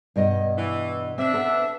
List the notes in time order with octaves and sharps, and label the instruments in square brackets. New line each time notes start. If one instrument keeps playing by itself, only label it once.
[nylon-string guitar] G2 B2 D#5
[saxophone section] E3
[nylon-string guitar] C4 [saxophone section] D4 E5
[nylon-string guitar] B3 A4